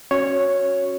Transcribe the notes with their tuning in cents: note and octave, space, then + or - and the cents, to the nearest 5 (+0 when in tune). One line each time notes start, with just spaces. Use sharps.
C#4 -20 F#4 -15 C#5 +0